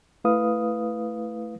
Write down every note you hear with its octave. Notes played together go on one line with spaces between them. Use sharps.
A3 E4 B4 F5 D#6